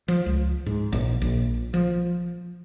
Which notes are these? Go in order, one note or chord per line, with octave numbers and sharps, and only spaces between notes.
F3
C#2
G#2
A#1
A#1
F3